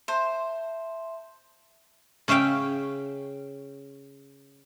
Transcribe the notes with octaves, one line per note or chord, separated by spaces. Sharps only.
C5 E5 A5 C6
C#3 C#4 E5 F5 G5